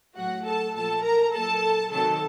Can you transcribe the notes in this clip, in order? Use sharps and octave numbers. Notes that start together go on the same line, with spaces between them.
A2 F#3 F#4 F#5
A4 A5
A#2 F3 A4 A5
A#4 A#5
A#2 F#3 A4 A5
C3 D#3 F#3 A4 A5